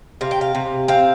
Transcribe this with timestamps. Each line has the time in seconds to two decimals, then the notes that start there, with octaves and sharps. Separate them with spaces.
0.21 C3 F5
0.31 G5
0.41 F5
0.55 C3
0.88 C4 F5